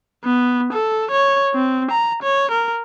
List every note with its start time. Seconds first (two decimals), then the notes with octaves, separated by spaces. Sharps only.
0.24 B3
0.73 A4
1.11 C#5
1.54 C4
1.91 A#5
2.22 C#5
2.51 A#4